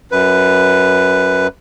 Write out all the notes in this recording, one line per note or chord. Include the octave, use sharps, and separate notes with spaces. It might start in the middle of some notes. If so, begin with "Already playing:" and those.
F#2 B4